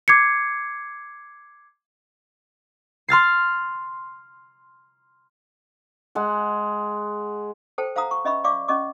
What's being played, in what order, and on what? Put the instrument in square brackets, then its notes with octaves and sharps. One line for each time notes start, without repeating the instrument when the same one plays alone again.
[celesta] D6 G#6 C7 C#7
[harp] C6 F6 A6 C7
[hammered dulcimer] G#3 F#5
[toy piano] A4 C5 G5 A5
C5 F5 F#5 A#5 D#6
C#6
C#4 D#5 E5 B5 C#6
D5 F5 C#6 D6
C#4 D#5 C#6 D6